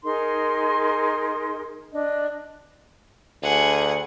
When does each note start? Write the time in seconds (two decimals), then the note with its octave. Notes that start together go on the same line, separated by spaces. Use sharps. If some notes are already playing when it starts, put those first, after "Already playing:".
0.05 D#4 G#4 A#4 C6
1.93 D4 D#5
3.43 D2 G#4 F#5